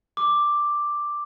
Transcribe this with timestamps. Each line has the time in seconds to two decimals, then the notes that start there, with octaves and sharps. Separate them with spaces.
0.17 D6